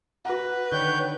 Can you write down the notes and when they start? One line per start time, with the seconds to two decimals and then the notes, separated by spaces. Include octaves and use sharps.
0.25 F#4 B4 F#5
0.72 D3 D#3 C#5 G5 G6